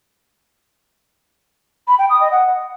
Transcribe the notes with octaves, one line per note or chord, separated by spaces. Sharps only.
B5
G5
D#6
D#5
F#5